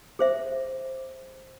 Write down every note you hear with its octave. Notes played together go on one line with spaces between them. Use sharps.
G#4 C5 E5